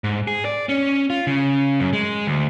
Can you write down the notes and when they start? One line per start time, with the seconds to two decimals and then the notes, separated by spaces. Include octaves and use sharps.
0.04 G#2
0.28 G#4
0.45 D5
0.69 C#4
1.10 F4
1.27 C#3
1.80 F#2
1.93 G#3
2.27 D2